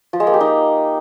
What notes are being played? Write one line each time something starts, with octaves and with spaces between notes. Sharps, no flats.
F3
G#3
A#3
G4
D#4